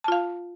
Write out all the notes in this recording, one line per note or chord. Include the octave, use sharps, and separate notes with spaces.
F4 F5 A5